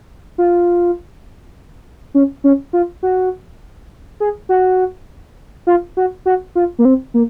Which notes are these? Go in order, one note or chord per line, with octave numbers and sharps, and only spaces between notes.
F4
C#4
C#4
F4
F#4
G#4
F#4
F4
F#4
F#4
F4
A#3
C4
A#3